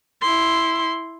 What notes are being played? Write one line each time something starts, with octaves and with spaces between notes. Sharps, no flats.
E4 C6